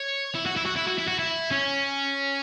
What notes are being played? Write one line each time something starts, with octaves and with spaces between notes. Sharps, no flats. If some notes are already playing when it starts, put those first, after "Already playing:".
Already playing: C#5
E4
F#4
E4
F#4
E4
F#4
E4
F#4
E4
C#4